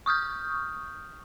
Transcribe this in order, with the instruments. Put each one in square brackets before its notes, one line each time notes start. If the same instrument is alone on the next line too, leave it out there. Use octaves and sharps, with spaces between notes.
[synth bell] C#6 D#6 F6 G6